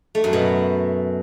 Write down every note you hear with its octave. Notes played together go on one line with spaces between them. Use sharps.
A3
F#2
B2